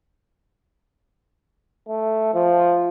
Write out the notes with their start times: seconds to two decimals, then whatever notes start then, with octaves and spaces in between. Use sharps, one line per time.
1.88 A3
2.34 F3